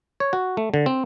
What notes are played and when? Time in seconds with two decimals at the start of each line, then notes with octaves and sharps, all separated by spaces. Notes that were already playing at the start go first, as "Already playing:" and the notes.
0.20 C#5
0.33 F#4
0.57 A3
0.74 D3
0.86 C4